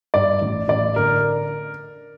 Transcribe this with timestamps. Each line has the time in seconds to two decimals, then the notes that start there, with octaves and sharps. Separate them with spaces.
0.14 G2 D5
0.41 A1
0.68 A1 D5
0.96 D3 A#4